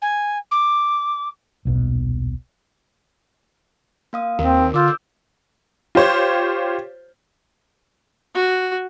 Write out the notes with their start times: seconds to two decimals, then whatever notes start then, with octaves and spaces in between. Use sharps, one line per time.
0.02 G#5
0.51 D6
1.65 D#1 B1 B2
4.13 A#3 F5 D#6
4.39 D#2 C4 A#4
4.74 D3 F4 D6 E6 G6
5.95 F4 G4 C5 C#5
8.35 F#4